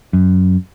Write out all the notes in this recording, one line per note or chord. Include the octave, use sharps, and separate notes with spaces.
F#2